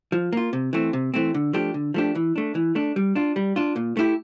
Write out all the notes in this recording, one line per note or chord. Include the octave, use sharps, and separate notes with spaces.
F3
A#3 F4
C3
E3 A3 C4
C3
E3 A3 C4
D3
F3 A3 D4 G4
D3
F3 A3 D4 G4
E3
A3 D4
E3
A3 D4
G3
D4 F4
G3
D4 F4
A#2
A3 E4 G4